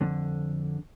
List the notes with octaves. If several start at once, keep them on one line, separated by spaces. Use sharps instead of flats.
F2 D3